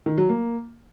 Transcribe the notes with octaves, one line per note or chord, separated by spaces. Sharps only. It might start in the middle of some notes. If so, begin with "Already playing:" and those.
D#3
F#3
A#3